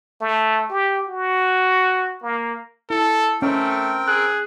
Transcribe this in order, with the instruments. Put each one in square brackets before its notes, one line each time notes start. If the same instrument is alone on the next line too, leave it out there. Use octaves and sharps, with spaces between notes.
[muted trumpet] A3
G4
F#4
A#3
[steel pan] E4 [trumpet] A4
[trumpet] A3 [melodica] C4 A#4 G5 [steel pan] C#4
[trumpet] G#4 [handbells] F#6